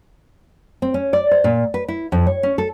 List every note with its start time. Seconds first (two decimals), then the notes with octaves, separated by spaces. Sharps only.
0.82 C4
0.94 C#4
1.13 D5
1.31 C5
1.44 A#2
1.74 B4
1.88 E4
2.12 F2
2.27 C#5
2.43 C#4
2.58 A4